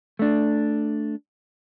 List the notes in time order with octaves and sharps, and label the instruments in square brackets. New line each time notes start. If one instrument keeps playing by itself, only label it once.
[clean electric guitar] A3 D4